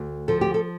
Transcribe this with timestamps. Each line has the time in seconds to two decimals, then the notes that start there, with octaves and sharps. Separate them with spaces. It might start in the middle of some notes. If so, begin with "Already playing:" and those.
Already playing: D2
0.28 F3 A4
0.41 G4
0.54 A4